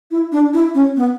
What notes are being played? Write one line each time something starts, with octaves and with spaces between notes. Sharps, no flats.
E4
D4
E4
C#4
B3